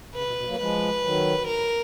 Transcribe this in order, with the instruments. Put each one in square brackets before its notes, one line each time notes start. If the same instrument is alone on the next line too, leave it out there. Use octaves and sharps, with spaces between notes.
[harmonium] C#3 [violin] B4
[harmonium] B2
B2
F#3 A#3
[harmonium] F3 G#3 [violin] B4
[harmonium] D#3 F#3
[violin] A#4